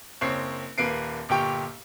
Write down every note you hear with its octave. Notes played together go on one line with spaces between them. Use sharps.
F#1 C4 C#5 C#6 C7
D#1 A#3 B4 C7 D7
G1 A#2 G4 G5 C#6